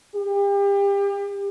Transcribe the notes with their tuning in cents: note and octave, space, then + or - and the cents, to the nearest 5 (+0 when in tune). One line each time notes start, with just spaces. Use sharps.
G4 +35